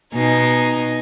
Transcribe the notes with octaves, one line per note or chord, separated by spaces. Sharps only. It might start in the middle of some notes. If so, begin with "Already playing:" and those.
B2 D#4 G#5